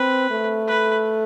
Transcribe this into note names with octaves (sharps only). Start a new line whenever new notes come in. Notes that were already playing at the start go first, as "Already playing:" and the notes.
Already playing: C4 B4
A3
B4